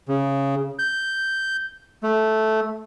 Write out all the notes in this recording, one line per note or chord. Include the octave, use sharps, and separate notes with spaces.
C#3
G6
A3